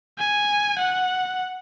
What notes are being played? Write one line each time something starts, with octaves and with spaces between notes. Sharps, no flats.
G#5
F#5